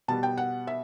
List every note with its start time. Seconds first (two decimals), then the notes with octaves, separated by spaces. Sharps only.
0.08 B2 G3 B3 A5
0.23 G5
0.38 F#5
0.67 E5